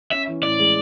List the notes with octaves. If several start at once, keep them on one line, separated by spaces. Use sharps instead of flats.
C#4 E5
E3
A2 D5
G#3